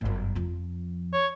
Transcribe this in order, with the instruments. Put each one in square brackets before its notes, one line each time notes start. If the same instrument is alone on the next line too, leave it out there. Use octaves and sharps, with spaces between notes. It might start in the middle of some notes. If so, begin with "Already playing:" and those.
[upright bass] G1 F#2
F2 F3
[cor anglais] C#5